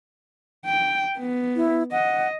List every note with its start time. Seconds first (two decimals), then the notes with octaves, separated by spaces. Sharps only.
0.66 G5
1.18 B3
1.56 E4
1.92 D#5 F#5